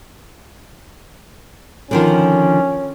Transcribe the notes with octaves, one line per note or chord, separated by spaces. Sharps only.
D3 D#3 F3 C#4